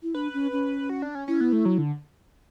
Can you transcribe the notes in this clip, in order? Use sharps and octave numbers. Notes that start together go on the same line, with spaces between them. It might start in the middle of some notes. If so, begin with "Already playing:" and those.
E4
D4 B4
C#4
C#4
F#4
D4
C#4
C#4 E4
B3
A3
F#3
D3